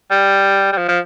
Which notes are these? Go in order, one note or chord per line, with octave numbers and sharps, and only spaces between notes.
G3
G3
F3
F3